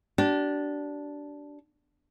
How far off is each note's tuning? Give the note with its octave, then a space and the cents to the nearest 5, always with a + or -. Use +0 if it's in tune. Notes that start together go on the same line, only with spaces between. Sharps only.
D4 -10 G4 -40